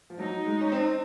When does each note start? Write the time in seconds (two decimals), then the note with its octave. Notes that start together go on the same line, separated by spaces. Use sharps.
0.10 F3
0.19 F#3 D#4
0.46 G#3
0.61 C#4
0.72 C4